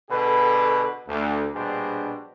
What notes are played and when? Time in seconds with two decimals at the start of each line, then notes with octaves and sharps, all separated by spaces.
0.10 B2 D3 G#4 A4 B4
1.08 D2
1.54 A#1 B2 G3 D4 G#4 C5